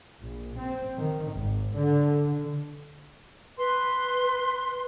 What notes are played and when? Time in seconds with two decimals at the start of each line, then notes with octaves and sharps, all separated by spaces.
0.20 A#1
0.57 C4
0.99 D#3
1.34 G#1
1.76 D3
3.58 B4 C6